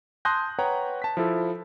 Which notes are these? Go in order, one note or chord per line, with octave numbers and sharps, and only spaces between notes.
A5 C6 D#6 F#6 G6 A#6
B4 C#5 F#5 G5 A#5
A5 B6
F3 E4 A4